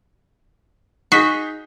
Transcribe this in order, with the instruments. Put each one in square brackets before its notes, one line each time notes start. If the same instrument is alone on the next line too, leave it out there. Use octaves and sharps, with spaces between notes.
[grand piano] D#4 G#4 [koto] F#4 [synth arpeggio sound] B6